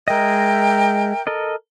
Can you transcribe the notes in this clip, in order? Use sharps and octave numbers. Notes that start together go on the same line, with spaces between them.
G#3 A#4 D#5 E5 G5
A4 A#4 D#5